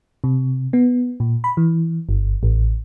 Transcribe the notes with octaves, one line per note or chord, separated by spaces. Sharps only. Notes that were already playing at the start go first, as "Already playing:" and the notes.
C3
B3
A#2
B5
E3
G1
A1